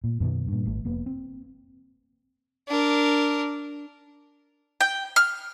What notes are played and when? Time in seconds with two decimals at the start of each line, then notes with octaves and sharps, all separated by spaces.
0.04 A#2
0.20 F#2 B2 D3 D#3
0.48 G2 A#2
0.66 G#1 A3
0.85 F1 A#3 B3
1.06 C4
2.68 D4 A#4
4.81 G5
5.16 F6